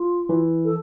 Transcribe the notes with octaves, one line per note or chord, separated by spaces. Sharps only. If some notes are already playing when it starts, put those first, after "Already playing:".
Already playing: F4
E3
A4